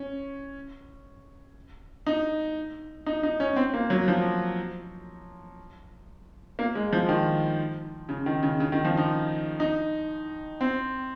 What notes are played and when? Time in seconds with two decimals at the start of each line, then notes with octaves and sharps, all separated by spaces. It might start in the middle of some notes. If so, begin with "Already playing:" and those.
Already playing: C#4
2.07 D#4
3.06 D#4
3.23 D#4
3.40 C#4
3.56 C4
3.74 A#3
3.90 F#3
4.08 F3
6.59 A#3
6.75 G#3
6.93 F3
7.09 D#3
8.09 C#3
8.26 D#3
8.43 C#3
8.60 C#3
8.72 D#3
8.85 F3
8.97 D#4
9.60 D#4
10.61 C4